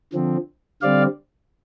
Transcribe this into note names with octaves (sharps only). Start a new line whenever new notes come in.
D3 F3 C4
D3 G3 C4 D5 F5